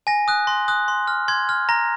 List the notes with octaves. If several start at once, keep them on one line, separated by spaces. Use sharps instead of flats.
G#5 A#6
D#6 F#6
C6 A#6
D#6 F#6
C6
F6
C6 G#6
F6
A#5 A#6